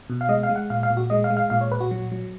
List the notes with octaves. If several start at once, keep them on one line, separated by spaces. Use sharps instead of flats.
B2
F5
G#3 D#5
F5
G#3
F#5
A#2 F5
F5
A#2
F#4
G#3 D#5
F5
G#3
F5
A#2 F5
C#5
A#2 B4
F#4
F#3
F#3